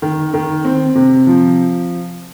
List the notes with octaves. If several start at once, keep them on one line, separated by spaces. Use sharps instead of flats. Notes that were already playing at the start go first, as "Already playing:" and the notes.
D#3
D#3
C4
C3
F3